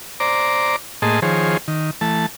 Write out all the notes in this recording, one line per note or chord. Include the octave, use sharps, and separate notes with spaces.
C5 D5 A#5 D6
A2 A#3 G#4 D#5 A5 C6
D#3 F3 G#4 C5 C#5
D#3
E3 A3 A5